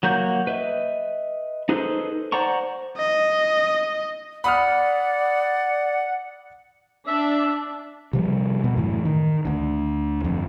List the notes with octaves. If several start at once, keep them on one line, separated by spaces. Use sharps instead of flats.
F#3 A#3 F#4 G6
B4 D#5 E5
D#4 G#4 A4 B4 C5
C5 D5 F#5 A#5 C#6
D#5
D5 F#5 B5 D#6 F6
D4 E5
C3 F3 G3
B2
F#2 A2 E3
D#3
D2 D3
G1 F2